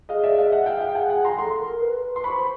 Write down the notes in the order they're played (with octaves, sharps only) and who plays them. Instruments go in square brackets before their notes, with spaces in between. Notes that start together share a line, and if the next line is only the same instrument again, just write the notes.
[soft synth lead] G#4 [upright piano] D#5 F5
[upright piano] D5 E5
D#5 F5
E5 F#5
F5 G5
F5 G5
F#5 G#5
F#5 G#5
A#5 C6
[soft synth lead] A4 [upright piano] A#5 C6
[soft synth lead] A#4
B4
B4
[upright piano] C6
[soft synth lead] C5 [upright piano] B5 C#6
[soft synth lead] C5